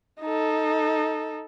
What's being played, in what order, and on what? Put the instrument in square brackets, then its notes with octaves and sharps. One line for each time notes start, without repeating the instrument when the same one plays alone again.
[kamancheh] D#4 A4